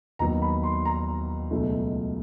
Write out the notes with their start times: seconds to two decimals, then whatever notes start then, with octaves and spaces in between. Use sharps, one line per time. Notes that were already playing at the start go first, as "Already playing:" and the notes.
0.19 D#2 D#3 F#3 B3 A#5
0.42 B5
0.63 C6
0.85 A#5
1.51 C#2 B2 F#3 A3